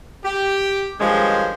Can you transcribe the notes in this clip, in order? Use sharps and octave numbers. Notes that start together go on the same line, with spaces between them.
G4
G2 D#3 F3 G#3 C#4 C5